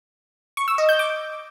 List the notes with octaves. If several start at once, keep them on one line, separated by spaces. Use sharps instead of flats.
C#6
E6
D#5
G6
D6